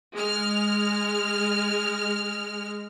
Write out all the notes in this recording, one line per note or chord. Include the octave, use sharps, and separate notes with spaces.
G#3 F6